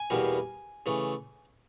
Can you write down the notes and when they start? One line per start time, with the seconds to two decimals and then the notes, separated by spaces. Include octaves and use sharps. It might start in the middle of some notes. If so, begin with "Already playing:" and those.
Already playing: G#5
0.10 E2 B2 G3 A#3
0.86 C#3 E3 A3